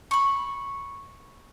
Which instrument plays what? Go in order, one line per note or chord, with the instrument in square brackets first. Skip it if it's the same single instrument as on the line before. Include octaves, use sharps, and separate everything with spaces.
[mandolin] B5 C#6